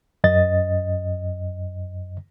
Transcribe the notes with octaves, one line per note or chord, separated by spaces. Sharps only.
F#2 D#5 A6